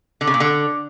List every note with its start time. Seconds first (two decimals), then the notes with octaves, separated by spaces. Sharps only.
0.21 D3
0.27 C#3
0.34 A#2
0.40 D3